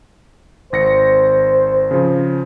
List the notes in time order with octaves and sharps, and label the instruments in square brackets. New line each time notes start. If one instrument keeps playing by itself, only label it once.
[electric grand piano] G#1 A#6 C#7 [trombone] C5
[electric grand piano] C#3 F3